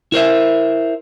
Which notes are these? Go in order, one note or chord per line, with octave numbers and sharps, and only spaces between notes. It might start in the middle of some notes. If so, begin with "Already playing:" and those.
E4 A#4 C5 E5